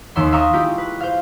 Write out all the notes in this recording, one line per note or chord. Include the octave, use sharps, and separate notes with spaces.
D#2 E5 C6 C#7
E5 F5 A#5 C6 C#6 D#6
G#3 E4 F4 G4
B4
C5 F5